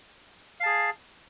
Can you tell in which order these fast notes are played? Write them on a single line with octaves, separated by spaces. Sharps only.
F5 A5 G#4